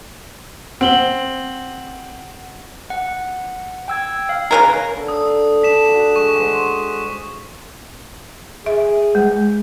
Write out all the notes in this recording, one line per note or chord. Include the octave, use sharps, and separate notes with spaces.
C4 F#5 F#7 G7
F#5
G5 E6 G#6
F5
C#3 G#3 A#4 B4 C#5 A#5
D3
D#6
D4 B6 E7
F#4
G#3 C#6 D6
C5 F#5
G#4 E5
G#3